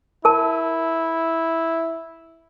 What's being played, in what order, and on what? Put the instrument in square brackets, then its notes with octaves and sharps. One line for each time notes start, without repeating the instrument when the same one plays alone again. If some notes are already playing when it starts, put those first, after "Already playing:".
[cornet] E4 [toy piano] A#4 A5